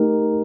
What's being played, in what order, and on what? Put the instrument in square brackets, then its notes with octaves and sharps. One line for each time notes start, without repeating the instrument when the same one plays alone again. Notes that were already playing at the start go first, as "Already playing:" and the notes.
Already playing: [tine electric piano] A3 D#4 G4 A#4